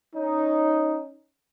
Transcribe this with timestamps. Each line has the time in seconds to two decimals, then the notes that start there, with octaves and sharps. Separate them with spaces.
0.15 C#4 D#4